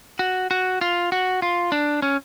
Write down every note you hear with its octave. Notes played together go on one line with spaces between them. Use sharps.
F#4
F#4
F4
F#4
F4
D4
C#4